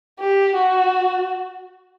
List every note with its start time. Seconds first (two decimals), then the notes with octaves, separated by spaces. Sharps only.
0.20 G4
0.56 F#4